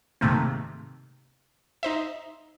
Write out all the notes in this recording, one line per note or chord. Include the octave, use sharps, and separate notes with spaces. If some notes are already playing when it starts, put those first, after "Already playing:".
G#2 C3 D#3 A3 A#3 C4
D#4 C5 E5